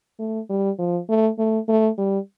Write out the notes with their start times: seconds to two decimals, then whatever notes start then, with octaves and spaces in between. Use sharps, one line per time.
0.19 A3
0.50 G3
0.79 F3
1.09 A3
1.39 A3
1.68 A3
1.98 G3